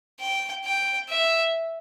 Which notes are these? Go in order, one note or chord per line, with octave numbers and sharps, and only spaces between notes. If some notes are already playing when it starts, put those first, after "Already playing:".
G5
G5
E5